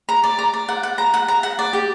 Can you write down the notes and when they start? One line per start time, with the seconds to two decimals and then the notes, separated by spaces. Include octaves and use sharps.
0.09 A#5
0.24 D5
0.38 A#5
0.54 D5
0.68 F#5
0.83 F#5
0.98 A#5
1.14 F#5
1.28 A#5
1.43 F#5
1.59 D5
1.73 G4